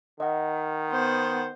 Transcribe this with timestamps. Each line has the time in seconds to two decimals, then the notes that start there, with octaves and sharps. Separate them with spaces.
0.20 D#3 D#5 F#5
0.90 B3 C5